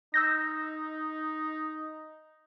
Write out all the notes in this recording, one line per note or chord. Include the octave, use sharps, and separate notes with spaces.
D#4 E6 G6 A#6